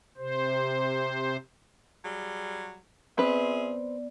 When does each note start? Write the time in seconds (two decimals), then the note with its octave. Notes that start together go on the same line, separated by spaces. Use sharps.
0.17 C3 C5
2.04 F#3 G3 G#4
3.18 B3 C4 F4 G#4 B4 D5 E5